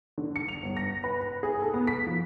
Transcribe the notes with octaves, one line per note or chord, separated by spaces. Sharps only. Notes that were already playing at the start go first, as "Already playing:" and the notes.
D3
C#7
F7
G1
A#6
B4
B4
G#4
A4
B3
B6
F3